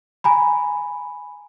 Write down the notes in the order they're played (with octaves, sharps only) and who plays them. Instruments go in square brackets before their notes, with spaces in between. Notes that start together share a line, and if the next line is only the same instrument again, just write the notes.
[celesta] G#5 A#5 B5